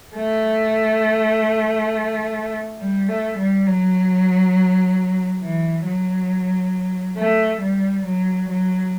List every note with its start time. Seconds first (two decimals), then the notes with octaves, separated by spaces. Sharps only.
0.16 A3
2.79 G3
3.08 A3
3.38 G3
3.67 F#3
5.42 E3
5.86 F#3
7.17 A3
7.61 G3
8.05 F#3
8.49 F#3